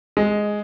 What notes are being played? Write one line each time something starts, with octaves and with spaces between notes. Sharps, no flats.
G#3